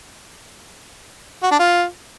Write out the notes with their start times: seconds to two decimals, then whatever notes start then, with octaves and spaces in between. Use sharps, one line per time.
1.43 F#4
1.51 D4
1.59 F4